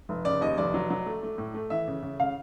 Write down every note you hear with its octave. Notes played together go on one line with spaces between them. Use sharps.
F1
C#3 D5
D#2 D#5
F1 D5
F#3
F#3
A3
A3
A2
A3
E3 E5
C#3
C#3
C#3 F5